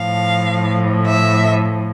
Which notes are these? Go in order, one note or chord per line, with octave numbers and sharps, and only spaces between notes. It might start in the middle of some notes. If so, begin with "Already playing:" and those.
Already playing: A2 F3 F5
E5